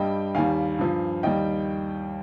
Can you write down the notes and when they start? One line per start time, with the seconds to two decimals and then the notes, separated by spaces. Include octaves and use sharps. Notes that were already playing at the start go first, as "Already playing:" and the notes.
Already playing: G2 G3 D#5 G5
0.35 D#2 D#3 G3 F5 G#5
0.78 G2 F3
1.23 D#2 D#3 G3 D#5 G5